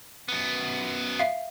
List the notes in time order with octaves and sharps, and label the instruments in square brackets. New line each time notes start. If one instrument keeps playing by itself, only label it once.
[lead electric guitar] F#2 B3
[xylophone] E5 F5